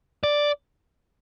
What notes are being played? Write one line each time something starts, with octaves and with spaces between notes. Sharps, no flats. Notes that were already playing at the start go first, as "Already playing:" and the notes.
D5